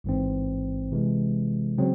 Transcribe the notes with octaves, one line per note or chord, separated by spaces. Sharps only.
A1 G#2 E3 C4
C3 E3 G#3
C#3 F#3 C4